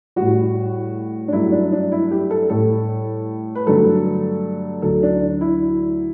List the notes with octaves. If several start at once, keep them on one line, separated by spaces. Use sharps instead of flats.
A2 G3 F#4
D4
G2 F#3 A3 E4
D4
D4
E4
G4
A4
A2 G3 A4
B4
G2 D3 F#3 A3 A4
D2 D3 F#3 A4
D4
E4